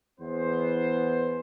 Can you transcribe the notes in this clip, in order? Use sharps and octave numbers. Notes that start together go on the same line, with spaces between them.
E2 B3 C5